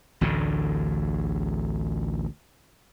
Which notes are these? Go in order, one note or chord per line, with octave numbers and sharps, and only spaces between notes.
A1 D2 A2 D3